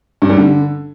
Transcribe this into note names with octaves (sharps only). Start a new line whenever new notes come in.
G2
G3
D3